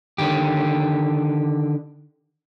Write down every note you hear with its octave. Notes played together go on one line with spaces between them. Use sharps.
D3 D#3 G4